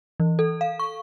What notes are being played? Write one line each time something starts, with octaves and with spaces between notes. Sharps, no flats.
E3
A4
F5
C#6